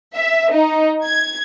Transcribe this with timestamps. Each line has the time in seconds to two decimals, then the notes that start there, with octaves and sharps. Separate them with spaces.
0.16 E5
0.52 D#4
1.04 G#6